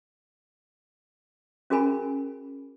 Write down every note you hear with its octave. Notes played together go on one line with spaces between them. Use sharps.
C#4 F#4 G#4 A#4 G#5 B5